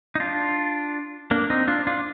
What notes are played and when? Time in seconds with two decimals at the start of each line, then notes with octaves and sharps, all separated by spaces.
0.15 D#4
0.20 D4 F4
1.31 A#3 D4
1.50 C4 D#4
1.68 D4 F4
1.87 D4 F4